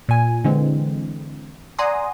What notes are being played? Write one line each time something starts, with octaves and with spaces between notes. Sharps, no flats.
A#2 G#5
D3 E3 G#3 C4
D5 F#5 G#5 A#5 C6 D#6